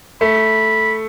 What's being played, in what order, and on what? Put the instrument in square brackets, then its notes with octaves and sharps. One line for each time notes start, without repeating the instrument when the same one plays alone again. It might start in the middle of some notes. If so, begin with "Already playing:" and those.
[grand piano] A3 [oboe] B5